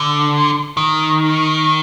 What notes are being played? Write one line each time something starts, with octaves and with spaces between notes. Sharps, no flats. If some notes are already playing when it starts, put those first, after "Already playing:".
Already playing: D3
D#3